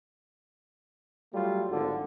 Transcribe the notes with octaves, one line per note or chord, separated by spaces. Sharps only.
F#3 G3 A3 F4
G#1 D3